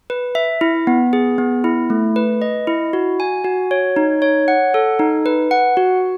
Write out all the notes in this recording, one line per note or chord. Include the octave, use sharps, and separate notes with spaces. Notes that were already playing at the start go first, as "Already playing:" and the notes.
B4
E5
E4
B3
G#4
B3
E4
A3
B4
D#5
E4
F#4
G#5
F#4
C#5
D#4
C#5
F#5
A4
D#4
B4
F#5
F#4